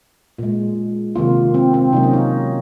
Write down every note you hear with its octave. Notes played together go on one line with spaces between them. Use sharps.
A#2 G#3
C3 D#3 A#3 F4
C4
C4
C3 F#3 A#3 D#4
C#4
D#4